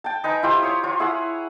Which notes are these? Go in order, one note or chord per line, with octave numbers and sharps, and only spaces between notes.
G5 A5
D#4 B4 G#5 A#5
E4 F4 G4 C5
C#5 D#6
F4 C#5
E4 G#4 F#5